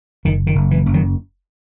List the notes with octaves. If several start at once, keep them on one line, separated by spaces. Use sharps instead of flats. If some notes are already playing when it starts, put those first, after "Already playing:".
F#1 D#3
D#3
F#1
E3
F#1
D#3 F#3